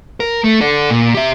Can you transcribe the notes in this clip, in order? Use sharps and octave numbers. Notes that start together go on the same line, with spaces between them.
A#4
A3
A4 D5
A#2
G4 E5